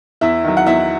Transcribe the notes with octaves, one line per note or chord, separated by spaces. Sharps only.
E2 E4 E5
D#3 F#3
F#5
E2 E4 E5